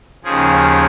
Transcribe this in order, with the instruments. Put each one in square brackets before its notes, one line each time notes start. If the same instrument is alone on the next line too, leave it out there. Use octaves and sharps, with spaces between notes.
[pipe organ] D#2 C#3 F3 G#4